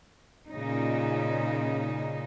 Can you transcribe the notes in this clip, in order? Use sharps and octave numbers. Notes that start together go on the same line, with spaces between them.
A#2 C#3 D#4